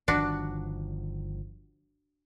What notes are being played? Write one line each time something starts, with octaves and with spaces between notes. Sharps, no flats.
G1 D#3 F3 D4 F#4